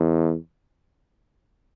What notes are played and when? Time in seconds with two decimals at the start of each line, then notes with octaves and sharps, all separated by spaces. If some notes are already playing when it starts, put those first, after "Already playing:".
Already playing: E2